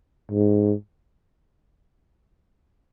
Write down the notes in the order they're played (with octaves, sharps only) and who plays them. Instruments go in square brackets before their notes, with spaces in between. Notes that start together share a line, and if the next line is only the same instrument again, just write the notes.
[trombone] G#2